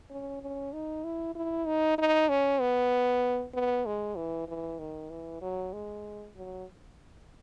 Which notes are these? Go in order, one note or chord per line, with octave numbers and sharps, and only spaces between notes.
C#4
C#4
D#4
E4
E4
D#4
D#4
C#4
B3
B3
G#3
E3
E3
D#3
E3
F#3
G#3
F#3